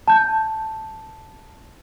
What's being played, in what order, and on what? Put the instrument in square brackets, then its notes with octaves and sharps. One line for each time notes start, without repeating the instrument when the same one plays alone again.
[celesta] A5 G6